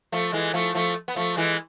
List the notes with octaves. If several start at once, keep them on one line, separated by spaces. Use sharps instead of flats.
F3 A3
E3 G#3
F3 A3
F3 A3
B3
F3 A3
E3 G#3